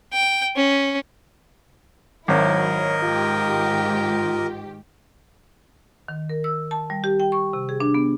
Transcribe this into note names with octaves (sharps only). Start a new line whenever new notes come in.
G5
C#4
G#1 F#3 E4 A#4 C#5 D#5
G#2 D#3 F4 G4
D#3
A#4
E6
A5
G3
G4
G5
C#6
C3
G#4
D4
B3